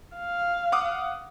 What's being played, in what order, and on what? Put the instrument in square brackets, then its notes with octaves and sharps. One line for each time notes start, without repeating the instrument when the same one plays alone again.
[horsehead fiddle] F5
[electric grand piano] F#5 D6 D#6